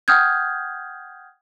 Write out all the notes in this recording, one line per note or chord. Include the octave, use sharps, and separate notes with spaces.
F#5 G5 D#6 F6 G6 G#6